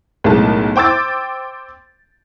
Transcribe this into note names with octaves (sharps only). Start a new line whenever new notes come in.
B1 A2 G#3 A#4 A5
C5 G5 D6 E6 A6